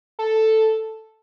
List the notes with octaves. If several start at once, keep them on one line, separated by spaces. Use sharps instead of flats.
A4